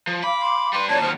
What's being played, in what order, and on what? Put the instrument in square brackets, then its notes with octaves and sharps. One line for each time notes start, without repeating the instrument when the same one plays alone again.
[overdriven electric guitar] F3
[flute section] F5 D6 [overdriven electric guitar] B5
[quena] C6
[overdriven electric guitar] G3 B4 [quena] C6
[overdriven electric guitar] F#2 A#2 [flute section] C#5 D5 G#6 [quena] A5
[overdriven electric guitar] D#2 F#3 [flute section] C5 D#6 F6